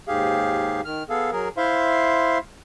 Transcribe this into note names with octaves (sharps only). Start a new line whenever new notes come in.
D#2 G#2 G4 G#4 F5
D#3 F6
B3 G#4 A4 F5
F#3 G#4 A#4
E4 C5 E5 F5 C6